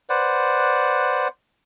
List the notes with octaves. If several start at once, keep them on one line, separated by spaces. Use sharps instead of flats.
B4 C5 D5 F#5